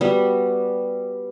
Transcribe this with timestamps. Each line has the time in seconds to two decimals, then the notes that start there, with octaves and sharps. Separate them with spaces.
0.01 G3 B3 F#4